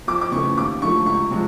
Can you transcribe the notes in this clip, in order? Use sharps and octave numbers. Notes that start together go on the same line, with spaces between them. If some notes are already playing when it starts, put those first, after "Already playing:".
F2 D6
D6
C#3 E3 A3 C#6
D#2 D6
D3 F3 A3 C#6
C#2 C#6
C3 F3 G#3